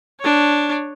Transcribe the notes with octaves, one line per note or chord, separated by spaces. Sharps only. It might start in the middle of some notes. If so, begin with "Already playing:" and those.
D4 C#5